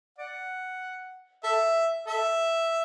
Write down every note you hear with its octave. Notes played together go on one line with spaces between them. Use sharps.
D5 F#5
A4 E5
A4 E5